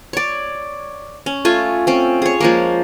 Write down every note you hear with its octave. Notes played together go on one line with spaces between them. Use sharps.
C#5 D5
C#4
A3 F4 G#5
C4 C#4
G#4 C#5
F3 G#3 A#3